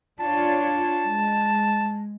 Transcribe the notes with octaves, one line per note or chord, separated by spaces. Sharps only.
D4 F4 C#5 A5
G#3